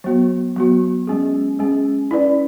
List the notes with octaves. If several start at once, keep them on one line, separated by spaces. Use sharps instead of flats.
F#3 B3 F#4
F#3 B3 F#4
G#3 C#4 G#4
G#3 C#4 G#4
C#4 E4 B4 D5